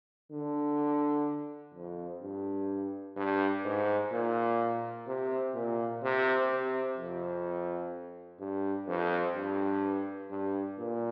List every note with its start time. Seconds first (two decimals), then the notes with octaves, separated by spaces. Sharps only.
0.31 D3
1.74 F2
2.22 G2
3.16 G2
3.65 G#2
4.12 A#2
5.07 C3
5.54 A#2
6.02 C3
6.50 C3
6.98 F2
8.40 G2
8.88 F2
9.35 G2
10.31 G2
10.78 A#2